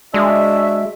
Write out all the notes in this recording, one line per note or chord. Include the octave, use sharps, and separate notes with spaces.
G#3 D4 F#4 E5